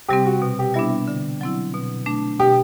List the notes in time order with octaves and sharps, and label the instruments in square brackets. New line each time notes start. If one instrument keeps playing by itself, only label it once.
[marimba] C3 G3 C4 [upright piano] G4
[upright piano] F#4
[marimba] B2
[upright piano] G4
[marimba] G3 B3 D4 [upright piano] E4
[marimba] D3
F#3 C4 E4
B2
A3 D4
[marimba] B2 [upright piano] G4